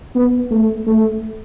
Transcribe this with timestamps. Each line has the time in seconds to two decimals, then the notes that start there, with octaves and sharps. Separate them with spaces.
0.15 B3
0.51 A3
0.87 A3